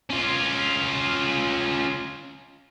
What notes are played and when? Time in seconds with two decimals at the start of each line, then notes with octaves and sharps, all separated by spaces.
0.10 C#4 F4